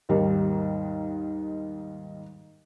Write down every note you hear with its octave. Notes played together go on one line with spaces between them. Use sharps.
D#2 G#2 D#3 G3